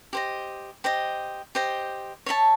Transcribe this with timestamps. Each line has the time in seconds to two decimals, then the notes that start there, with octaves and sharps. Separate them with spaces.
0.13 G4 C5 D#5
0.84 G4 C5 D#5
1.55 G4 C5 D#5
2.26 C#5 E5 A5